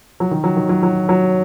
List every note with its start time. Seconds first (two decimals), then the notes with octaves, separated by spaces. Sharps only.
0.20 F#3
0.31 D#3
0.44 F#3
0.57 D#3
0.69 F#3
0.83 F#3
1.09 F#3